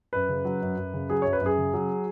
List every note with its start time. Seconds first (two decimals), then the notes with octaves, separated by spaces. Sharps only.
0.13 F#2 B4
0.29 C#3
0.45 F#3
0.62 F#2
0.77 F#2
0.94 C#3
1.10 F#3 G#4
1.22 F#2 C#5
1.33 B4
1.41 F#2 G#4
1.58 C#3
1.74 F#3